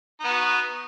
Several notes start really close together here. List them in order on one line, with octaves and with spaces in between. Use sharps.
D#4 B3 F#4